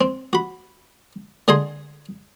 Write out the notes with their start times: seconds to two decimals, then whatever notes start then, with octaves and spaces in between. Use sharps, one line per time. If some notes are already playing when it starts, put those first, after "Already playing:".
0.01 C4
0.33 F#4 B5
1.48 D3 G#4 D#5 G#5 C6